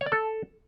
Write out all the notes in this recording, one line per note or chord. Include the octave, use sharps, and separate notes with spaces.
C#5
D5
A4